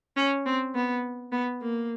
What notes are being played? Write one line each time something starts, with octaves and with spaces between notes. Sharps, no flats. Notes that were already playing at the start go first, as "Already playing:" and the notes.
C#4
C4
B3
B3
A#3